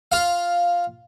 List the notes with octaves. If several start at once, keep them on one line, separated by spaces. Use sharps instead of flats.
F4 F5